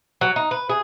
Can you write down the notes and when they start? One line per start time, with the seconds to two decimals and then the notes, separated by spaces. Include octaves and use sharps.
0.21 F#3
0.36 D#4
0.51 B4
0.70 G#4